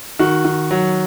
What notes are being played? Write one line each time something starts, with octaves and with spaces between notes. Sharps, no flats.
D#3 F#4
D#3
F#3